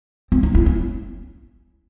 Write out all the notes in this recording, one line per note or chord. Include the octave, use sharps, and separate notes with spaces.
C4
D#4
E4
C#4